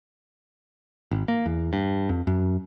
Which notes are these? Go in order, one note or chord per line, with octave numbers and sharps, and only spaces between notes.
G#1
A#3
E2
G2
F2
F#2